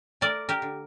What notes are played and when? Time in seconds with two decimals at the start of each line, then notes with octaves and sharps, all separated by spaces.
0.21 A3 A#4 D5
0.49 G4 A#4
0.62 D3